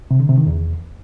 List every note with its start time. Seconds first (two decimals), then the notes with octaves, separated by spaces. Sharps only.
0.11 C3
0.20 D3
0.29 C3
0.38 D#3
0.47 E2